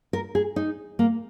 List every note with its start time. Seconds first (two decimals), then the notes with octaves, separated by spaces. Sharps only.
0.13 A#4
0.35 G#4
0.56 D#4
0.99 A#3